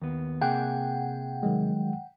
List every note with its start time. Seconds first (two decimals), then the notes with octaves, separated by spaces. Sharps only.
0.02 D#2 B3
0.41 C3 A#3 G#4 F#5 G5
1.43 D#3 F#3 G#3